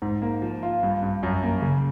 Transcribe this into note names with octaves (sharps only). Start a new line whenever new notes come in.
G#2
A#3
F3
F4
G2
G2
F#2
A#3
C#3